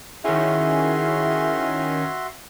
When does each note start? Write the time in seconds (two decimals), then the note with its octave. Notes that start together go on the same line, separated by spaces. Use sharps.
0.25 D#3 C#4 E4 F#4 G#4 E5 C6